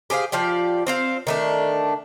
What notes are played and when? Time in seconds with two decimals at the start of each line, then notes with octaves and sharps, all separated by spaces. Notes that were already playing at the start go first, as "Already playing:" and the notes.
0.10 G4 G#4 C5 F5
0.32 F3 F4 G4 D5
0.87 C4 C5 F5
1.27 D#3 A3 D4